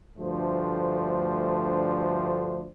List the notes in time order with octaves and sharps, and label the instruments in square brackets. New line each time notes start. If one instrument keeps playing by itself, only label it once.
[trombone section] D2 G2 F3 A3 D4 C5